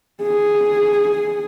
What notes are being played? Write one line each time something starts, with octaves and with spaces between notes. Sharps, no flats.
G#4